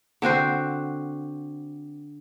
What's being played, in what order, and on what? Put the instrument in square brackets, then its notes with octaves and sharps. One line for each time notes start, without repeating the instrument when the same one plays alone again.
[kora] D3 C4 F#4 C5